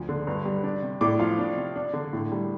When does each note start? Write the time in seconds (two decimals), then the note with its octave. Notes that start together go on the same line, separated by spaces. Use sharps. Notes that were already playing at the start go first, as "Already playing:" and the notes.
Already playing: D2 F3
0.09 D3
0.27 G2
0.45 G3
0.64 D4
0.82 C3
1.01 A2 D5 D6
1.19 F3 F4 F5
1.39 D4
1.57 C3
1.76 D4
1.93 D3
2.13 A2
2.32 G3